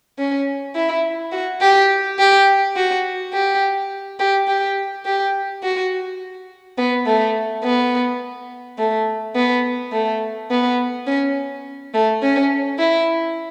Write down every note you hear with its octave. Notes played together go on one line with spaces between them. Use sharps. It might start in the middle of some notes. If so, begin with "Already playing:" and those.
C#4
E4
F#4
G4
G4
F#4
G4
G4
G4
G4
F#4
B3
A3
B3
A3
B3
A3
B3
C#4
A3
C#4
E4